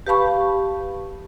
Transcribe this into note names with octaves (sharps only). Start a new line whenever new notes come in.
G4 B4 F5 A5 B5 C#6